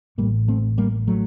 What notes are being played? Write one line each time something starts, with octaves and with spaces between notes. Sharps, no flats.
A1 A2 G3 A#3
A3 C4
G3 A#3
F#3 A3